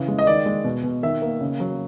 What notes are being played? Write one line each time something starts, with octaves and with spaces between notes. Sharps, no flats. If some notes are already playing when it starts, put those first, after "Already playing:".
Already playing: C#3 E3
G#3
D#5
D#3 D5
G#3
B2
B2
D#3 E5
A#3
C#3
F#3